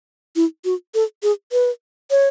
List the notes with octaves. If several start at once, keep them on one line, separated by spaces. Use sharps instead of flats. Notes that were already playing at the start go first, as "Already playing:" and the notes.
E4
F#4
A4
G#4
B4
C#5